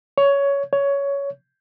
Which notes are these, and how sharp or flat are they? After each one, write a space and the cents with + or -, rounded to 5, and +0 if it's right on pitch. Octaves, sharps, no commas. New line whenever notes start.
C#5 +15
C#5 +15